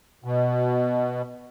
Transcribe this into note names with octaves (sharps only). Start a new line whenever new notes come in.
B2